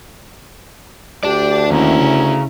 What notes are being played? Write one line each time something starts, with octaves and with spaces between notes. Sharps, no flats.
D2 G4 D5 A5
D#2 C#4 E4 A#5
C#3